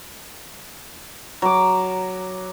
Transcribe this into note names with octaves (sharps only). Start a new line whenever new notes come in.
F#3 D6